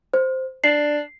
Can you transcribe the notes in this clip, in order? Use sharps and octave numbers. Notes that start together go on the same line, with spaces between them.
C5
D4 C7